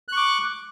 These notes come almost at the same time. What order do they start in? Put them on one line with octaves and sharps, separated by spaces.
F#6 C#6 D6